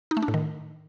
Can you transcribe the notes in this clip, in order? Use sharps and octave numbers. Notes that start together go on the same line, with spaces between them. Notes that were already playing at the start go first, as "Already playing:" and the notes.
D#4
A3
D4
A2
D#3